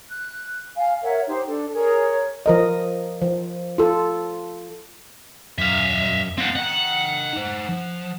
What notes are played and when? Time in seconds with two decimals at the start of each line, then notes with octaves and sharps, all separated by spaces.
0.10 F#6
0.77 F5 G#5
1.03 A#4 C#5 E5 F#5
1.27 D#4 G4 C5
1.47 D4 A4
1.74 G#4 A#4 C#5
2.46 F3 A#4 D#5
3.22 F3
3.78 F4 A4
5.59 F#2 E5 F5
6.38 C4 F5 F#5
6.55 D#5 F#5 G5
7.33 D#4 C5
7.69 F3